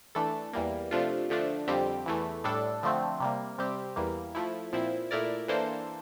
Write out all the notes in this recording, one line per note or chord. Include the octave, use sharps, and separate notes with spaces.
E3 A3 D4 A4
E2 E3 G3 A#3
C3 F3 A3 D4 F4
D3 F3 A3 D4
F2 D3 G3 C4 G4
E2 E3 A3
A2 G3 D4 A4
D3 F3 A3 C4
C3 G3 A#3
C3 G3 C4 G4
E2 E3 G3 A#3
F3 A3 E4
A#2 F3 C4 E4
A#2 A3 E4 A#4 D5
E3 A#3 D4 A4 C5